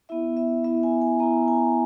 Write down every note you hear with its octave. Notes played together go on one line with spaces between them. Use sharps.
B3 E4 E5
E5
B3 E4 E5
G#5
G#5
B3 E4 A#5
G#5